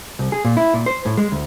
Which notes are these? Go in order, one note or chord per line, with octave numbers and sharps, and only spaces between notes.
C2
G#4
A#2
E4
A#2
C5
A2
G#3
D2